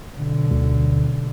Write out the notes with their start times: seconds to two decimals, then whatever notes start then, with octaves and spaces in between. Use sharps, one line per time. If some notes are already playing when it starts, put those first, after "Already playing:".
0.15 B1 D3
0.51 D2